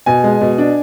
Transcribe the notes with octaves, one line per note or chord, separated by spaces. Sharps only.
B2 G#5
G#3
B2
D4